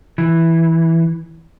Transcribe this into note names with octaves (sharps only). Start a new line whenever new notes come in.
E3